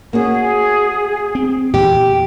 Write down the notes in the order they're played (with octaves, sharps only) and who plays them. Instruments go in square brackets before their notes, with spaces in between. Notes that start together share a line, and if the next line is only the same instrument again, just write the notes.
[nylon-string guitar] A#3 C#4 F#4 [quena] G#4
[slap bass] C4
[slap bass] E2 A#2 E3 [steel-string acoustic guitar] G4